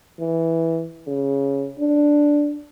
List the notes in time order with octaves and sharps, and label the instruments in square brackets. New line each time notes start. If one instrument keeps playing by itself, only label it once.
[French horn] E3
C#3
D4